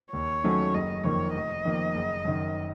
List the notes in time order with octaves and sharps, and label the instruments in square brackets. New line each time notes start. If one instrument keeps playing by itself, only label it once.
[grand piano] D#2 [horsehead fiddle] C#5
[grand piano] D#3 F#3 A3 C#4
[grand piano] F#1 [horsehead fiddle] D#5
[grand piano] F2 D#3 A#3 [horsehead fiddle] C#5
[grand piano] F1 [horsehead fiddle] D#5
[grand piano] F2 D#3 A#3
F#1
F#2 D#3